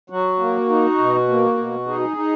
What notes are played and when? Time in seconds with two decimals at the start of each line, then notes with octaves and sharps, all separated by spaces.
0.10 F#3 F#4
0.39 A#3
0.69 D#4
0.99 B2
1.28 A#3
1.58 B2
1.87 D#4 G#4
2.17 D#4